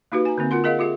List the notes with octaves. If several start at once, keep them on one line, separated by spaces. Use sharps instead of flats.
A#3 D#4 F#4 G4 B4
G#5 A#5
D3 A#3 C4
F4 A#4 F#5 C6
G#4 A#4 D#5 F5 F#5
F4 G4 G#4 E5